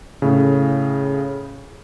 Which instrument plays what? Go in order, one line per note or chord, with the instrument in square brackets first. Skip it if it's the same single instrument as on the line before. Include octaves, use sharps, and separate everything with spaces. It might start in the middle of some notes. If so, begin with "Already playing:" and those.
[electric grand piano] A2 C#3